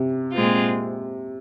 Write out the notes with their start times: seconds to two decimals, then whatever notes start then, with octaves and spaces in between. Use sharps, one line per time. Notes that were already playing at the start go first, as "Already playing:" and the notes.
Already playing: C3
0.34 A#2 G#3 C4 F4